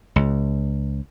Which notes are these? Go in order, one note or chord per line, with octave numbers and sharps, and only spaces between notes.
C#2